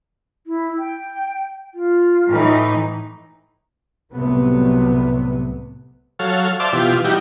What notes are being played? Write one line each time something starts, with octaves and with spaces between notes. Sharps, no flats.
E4
G5
F4
A2 E3 D#4
C2 A2 C3 F#3 A3 B3
F#3 A4 C#5 F5
C5 D5 E5 F5 A5 D6
B2 E3 F4 G4
G3 D#4 E4 F#4 G4